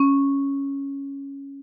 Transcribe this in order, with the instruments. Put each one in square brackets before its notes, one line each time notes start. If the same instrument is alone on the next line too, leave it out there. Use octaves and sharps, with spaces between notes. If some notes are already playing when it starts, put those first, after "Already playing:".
Already playing: [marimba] C#4